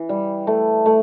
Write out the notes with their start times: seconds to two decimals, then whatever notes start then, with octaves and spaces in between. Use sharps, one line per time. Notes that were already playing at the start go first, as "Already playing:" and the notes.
Already playing: E3
0.09 G3
0.47 A3
0.86 A3